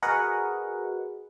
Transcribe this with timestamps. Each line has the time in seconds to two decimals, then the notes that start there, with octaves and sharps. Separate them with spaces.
0.02 F#4 G#4 A#4 B4 D#5 F#5